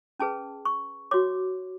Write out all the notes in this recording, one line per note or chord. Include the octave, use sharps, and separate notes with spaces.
C#4 G#4 B4 A5
C#6
F#4 C#5 D6